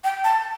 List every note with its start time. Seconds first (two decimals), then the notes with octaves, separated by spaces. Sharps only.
0.04 G5
0.24 A5